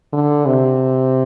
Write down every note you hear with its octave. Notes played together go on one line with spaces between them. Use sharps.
D3
C3